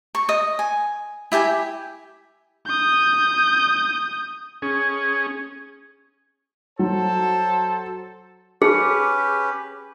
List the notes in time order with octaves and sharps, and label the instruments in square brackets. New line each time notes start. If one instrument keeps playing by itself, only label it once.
[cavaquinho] C#6
D#5
G#5
E4 G4 G5 G#5
[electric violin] D#6 G6
[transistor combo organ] C#4 G#4
[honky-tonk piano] F#3 [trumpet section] A4 C5 A5
[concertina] C#4 G4 B4 [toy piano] G#4